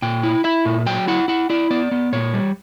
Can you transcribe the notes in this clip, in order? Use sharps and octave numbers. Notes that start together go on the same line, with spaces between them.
A#2 G5
E4
E4 E5
A#2
F#3 G5
E4 F#5
E4 F#5
E4 D5
B3 D5
B3
A#2 C#5
G3